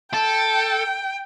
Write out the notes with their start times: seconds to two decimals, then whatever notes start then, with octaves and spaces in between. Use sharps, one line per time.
0.14 A4 G5